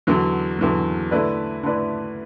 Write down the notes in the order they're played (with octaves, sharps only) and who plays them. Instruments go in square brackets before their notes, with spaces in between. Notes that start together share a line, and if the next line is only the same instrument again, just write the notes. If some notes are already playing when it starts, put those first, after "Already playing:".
[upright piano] E2 D3 F#3
E2 D3 F#3
D3 A3 E4 B4 D5
D3 A3 E4 B4 D5